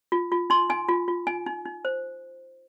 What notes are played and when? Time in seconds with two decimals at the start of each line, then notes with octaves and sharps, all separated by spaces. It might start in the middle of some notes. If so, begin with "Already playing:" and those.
0.12 F4
0.32 F4
0.50 D#4 C6
0.69 D#4 G#5
0.88 F4
1.08 F4
1.27 D#4 G#5
1.46 D#4
1.65 D#4
1.85 C5